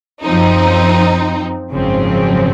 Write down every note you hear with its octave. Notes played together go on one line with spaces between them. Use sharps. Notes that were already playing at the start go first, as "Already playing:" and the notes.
F#2 F3 C4 D#4
G#1 F#2 C#3 F3 C4